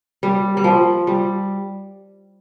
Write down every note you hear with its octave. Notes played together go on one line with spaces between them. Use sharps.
G3
G3
F3
G3